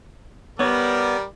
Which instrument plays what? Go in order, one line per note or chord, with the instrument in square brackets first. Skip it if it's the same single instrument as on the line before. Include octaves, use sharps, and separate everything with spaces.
[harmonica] G3 A#4 D5 [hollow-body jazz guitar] B3 C#5